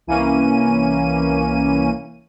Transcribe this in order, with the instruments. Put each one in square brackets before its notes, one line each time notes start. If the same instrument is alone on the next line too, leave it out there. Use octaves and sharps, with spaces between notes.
[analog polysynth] C2 E3 A#3 C#4 D#7